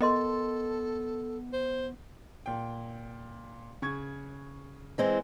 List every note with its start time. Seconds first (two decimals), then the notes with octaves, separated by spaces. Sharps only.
0.01 B3 A4 A#4 D#5 C6
1.53 C5
2.46 A#2 G5
3.82 C#3 C#6 G#6
4.98 E3 G#3 C4